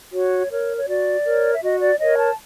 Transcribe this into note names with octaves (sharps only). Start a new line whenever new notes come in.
F#4 C#5
A#4 C#5
C#5
F#4 D5
A#4 C#5
E5
F#4 D#5
D5
A#4 C#5 D#5
A5